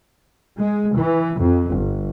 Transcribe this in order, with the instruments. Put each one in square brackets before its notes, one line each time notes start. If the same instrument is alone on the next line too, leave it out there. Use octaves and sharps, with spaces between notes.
[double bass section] G#3
E3
F2
G1